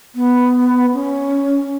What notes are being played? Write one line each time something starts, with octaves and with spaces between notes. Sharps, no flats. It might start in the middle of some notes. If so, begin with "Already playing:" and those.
B3
C#4